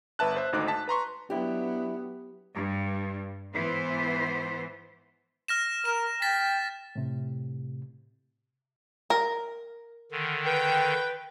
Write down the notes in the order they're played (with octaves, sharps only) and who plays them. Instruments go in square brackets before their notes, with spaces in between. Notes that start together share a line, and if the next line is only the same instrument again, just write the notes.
[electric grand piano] G1 B4 E5 A5 F#6
C5 E5
G#1 D2 D#4 D6 F#6
A5 B6
B4 A#5 C6 C#6
[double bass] F#3 B3 [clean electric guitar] D4 E4 [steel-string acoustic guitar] G4
[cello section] G2
G#2 E3 B3 C5
[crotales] F6 A#6 E7
[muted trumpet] A#4 [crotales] E7
[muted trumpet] G5 [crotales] A6 B6
[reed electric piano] A2 C3
[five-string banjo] A#4
[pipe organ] D3 D#3
[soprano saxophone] B4 [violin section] G5